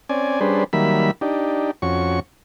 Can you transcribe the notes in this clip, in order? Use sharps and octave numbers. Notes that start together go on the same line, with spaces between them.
C4 C#4 D5 G#5
G3 C#4 D4 G#4 B4 C5
D#3 F#3 G3 A#3 E5 B5
D4 D#4 G4
F2 C#4 F#4 C#6